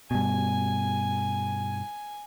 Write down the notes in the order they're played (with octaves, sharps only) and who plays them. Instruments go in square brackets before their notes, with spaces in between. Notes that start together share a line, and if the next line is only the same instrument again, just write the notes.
[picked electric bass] G2 B2 [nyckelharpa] G#5